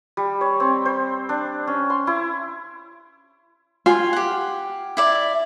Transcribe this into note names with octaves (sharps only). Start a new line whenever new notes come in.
G3
C#5
C4
C5
D4
C#4
C6
E4
F4 G5 G#5
G4 F#5
E4 D5 E5